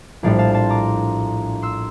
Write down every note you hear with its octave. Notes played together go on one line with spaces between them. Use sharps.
A#1 A2 G3 D4 D5 F5
F5 A5
A5 C6
A#5 D6
C6 E6